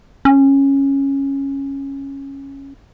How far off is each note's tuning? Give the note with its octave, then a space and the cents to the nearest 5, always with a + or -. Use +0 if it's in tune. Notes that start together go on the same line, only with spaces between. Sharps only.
C#4 -10